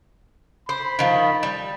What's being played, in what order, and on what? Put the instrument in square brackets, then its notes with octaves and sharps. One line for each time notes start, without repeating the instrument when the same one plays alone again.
[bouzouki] C5 [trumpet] B5
[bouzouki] D#3 F3
G3